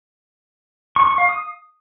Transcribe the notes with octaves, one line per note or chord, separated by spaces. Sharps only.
C#6
C#6
F5
D#6